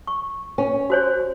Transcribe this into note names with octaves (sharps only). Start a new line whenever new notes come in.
C#6
C#4
F#4 C5 C#5